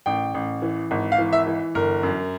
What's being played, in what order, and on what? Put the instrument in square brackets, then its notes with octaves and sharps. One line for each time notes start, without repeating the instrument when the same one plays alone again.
[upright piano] A1 G5
A1
E3
G#1
F5
E3
E5
E3
G1 A#4
F#2